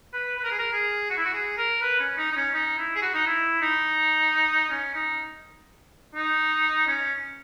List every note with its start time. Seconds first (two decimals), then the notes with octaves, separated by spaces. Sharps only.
0.13 B4
0.37 B4
0.44 A#4
0.51 G#4
0.59 A#4
0.73 G#4
1.10 F#4
1.17 E4
1.25 F#4
1.33 G#4
1.58 A#4
1.82 B4
2.00 C#4
2.18 D#4
2.31 D#4
2.36 C#4
2.54 D#4
2.78 E4
2.95 G#4
3.02 F#4
3.14 D#4
3.26 E4
3.62 D#4
4.70 C#4
4.95 D#4
6.15 D#4
6.87 C#4